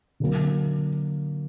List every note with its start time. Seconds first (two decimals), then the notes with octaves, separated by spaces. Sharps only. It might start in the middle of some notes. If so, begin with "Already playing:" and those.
0.20 D3 F#3 A#3